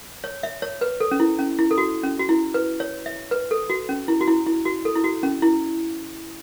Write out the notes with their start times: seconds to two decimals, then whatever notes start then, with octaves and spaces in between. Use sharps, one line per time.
0.24 C#5
0.43 E5
0.62 C#5
0.81 B4
1.00 A4
1.11 C#4
1.20 E4
1.39 C#4
1.59 E4
1.71 A4
1.78 F#4
2.04 C#4
2.19 F#4
2.29 E4
2.54 B4
2.80 C#5
3.06 E5
3.31 B4
3.51 A4
3.70 F#4
3.89 C#4
4.08 E4
4.21 F#4
4.27 E4
4.46 E4
4.65 F#4
4.85 A4
4.96 E4
5.04 F#4
5.23 C#4
5.42 E4